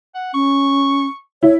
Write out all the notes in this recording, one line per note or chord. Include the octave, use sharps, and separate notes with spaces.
F#5
C#4 C#6
E4 C#5